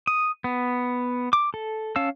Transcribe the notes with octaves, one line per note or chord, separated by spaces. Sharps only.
D#6
B3
D6
A4
C#4 F5 A5 E6